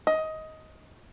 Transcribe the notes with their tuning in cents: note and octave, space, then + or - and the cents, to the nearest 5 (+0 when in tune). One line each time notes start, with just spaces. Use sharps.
D#5 +15